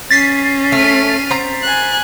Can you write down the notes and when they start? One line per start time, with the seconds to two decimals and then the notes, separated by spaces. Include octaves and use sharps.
0.11 C#4 A6 B6 C7
0.72 A3 F6 D#7
1.31 C4 A#5
1.63 G#5 F#6